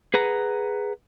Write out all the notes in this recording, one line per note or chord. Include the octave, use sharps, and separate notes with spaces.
G#4 B4 F#5 A#5